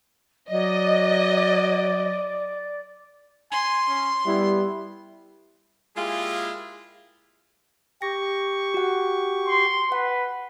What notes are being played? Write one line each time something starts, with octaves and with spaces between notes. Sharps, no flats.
F#3 D5 D#5
G#5 C6
C#4
G3 B3 E4
G#3 A#3 E4 F4 G4 G#4
G4 C#6 A#6
F#4 F#5
C6
B4 F#5